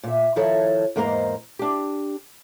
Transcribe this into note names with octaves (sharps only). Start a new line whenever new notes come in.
A#2 E5
D#3 F3 E4 A4 C#5
E2 G#2 A#3 C5 D#5 A#5
D4 G4